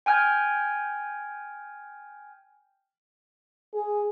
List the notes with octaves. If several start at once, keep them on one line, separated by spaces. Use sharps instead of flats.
G5 G#5 F6 G6 G#6
G#4